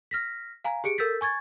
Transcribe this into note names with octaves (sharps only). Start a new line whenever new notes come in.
F6 A#6 B6
F5 G#5 A#5
G4 G#4 C#7 D7
A4 A#4 E6 G6 A6 B6
G#5 C#6 G#6 A6